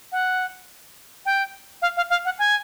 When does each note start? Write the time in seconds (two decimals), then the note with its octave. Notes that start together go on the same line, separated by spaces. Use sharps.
0.12 F#5
1.26 G5
1.82 F5
1.97 F5
2.10 F5
2.25 F#5
2.39 G#5